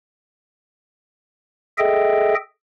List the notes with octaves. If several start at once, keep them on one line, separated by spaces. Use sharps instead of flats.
G#4 A4 D#5 E5 G5